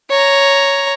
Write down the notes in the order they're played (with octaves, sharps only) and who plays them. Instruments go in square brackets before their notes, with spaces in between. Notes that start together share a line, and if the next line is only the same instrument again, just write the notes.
[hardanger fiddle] C#5 A#5